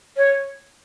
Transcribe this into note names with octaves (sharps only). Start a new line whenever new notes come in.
C#5